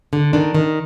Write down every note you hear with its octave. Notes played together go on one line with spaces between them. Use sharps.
D3
D#3 D4
D#3